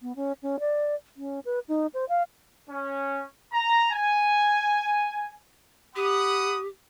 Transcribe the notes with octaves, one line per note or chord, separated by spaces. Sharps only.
B3
C#4
C#4
D5
C#4
B4
D#4
C5
F5
C#4
A#5
G#5
G4 F#5 B5 D#6